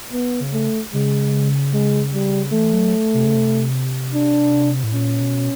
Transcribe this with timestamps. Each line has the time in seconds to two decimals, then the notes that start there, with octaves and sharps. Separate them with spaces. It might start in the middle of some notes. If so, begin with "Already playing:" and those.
0.12 B3
0.40 C#3
0.53 A3
0.93 C#3 G#3
1.73 G#3
2.13 G3
2.53 E3 A3
2.73 F#3
3.14 C3
3.24 C#3
3.35 C3
4.14 D4
4.84 A2
4.93 A#2 C#4
5.20 B2